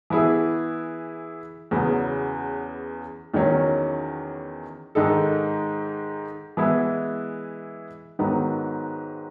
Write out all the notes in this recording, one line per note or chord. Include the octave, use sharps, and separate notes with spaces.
E3 B3 E4 G#4
E2 C#3 F#3 B3
E2 D#3 F#3 C#4
G#2 D#3 G#3 D#4 A4
E3 G#3 B3 E4 G#4
G#2 D#3 F#3 B3